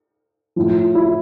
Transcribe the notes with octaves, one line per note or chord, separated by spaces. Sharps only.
A2 F3
E4